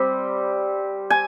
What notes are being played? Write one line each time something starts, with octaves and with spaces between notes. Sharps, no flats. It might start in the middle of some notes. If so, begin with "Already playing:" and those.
Already playing: G3 C4
G#5